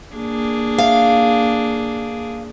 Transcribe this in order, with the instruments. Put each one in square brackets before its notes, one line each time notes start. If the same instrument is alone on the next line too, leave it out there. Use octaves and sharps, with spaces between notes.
[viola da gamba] A#3 D4 G#4
[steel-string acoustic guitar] F5